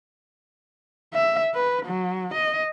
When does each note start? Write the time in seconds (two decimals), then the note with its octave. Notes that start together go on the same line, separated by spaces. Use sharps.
1.14 E5
1.54 B4
1.86 F#3
2.35 D#5